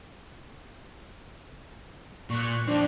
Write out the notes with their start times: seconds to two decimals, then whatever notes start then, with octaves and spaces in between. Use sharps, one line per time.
2.30 A#2 C#6 F#6
2.67 F3 C4 D4